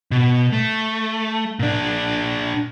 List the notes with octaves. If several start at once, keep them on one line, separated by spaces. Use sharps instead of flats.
B2
A3
A#2 D4